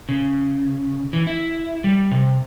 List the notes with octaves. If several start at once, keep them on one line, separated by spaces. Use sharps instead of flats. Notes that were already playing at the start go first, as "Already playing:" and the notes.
C#3
E3
E4
G3
C3